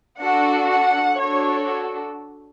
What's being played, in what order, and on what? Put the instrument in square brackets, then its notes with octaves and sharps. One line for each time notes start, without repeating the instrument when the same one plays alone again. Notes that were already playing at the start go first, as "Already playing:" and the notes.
[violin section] D4 F#4 A4 F#5
F#5
D4 F#4 A4 C#5